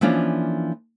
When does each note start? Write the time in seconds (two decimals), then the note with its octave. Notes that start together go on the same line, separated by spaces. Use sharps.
0.01 E3 F3 A#3 C#4 D4 F4